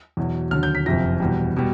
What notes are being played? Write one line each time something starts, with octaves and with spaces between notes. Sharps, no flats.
E2 B2 F#3
D#2 D3 F#3 F6
G6
B6
F#1 F2 C3 F3 A#6
E2 B2 G3
B2 G3